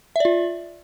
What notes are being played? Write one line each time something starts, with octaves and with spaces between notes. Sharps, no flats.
F4 D5 E5